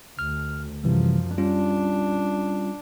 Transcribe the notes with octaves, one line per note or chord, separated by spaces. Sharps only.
D2 F6
F#2 C3 E3 F3 G3
G3 C#4 D4 F4